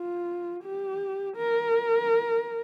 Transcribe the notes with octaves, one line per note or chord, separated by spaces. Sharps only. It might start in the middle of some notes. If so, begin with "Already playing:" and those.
Already playing: F4
G4
A#4